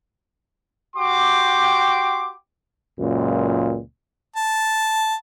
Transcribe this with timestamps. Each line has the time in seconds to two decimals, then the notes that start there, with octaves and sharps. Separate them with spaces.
0.96 F#4 G4 G5 C6 D6
2.99 C#2 F#2 A#2
4.36 A5